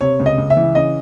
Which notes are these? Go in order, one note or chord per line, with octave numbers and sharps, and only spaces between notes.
C3 C#5
C#2
D#5
C#2
E5
E3
C#3 D#5